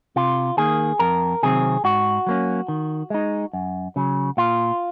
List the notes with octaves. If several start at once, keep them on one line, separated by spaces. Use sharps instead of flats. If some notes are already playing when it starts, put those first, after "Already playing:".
C3 F4
D#3 A#3 G#4
F2 A#4
C3 D#3 F#3 C4 G#4
G#2 F#4
F#3 A#3 C#4
D#3
G#3 D#4
F#2
C#3 F#3
A#2 F4